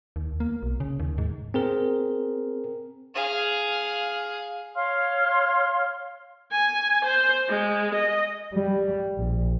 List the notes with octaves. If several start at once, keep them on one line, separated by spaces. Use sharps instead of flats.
D#2
A#3
B1
C#3
D#2
G#2
C4 G#4 A#4
G#4 F5
C#5 F5 C6 F6
G#5
C5
G#3
D#5
G3
A#1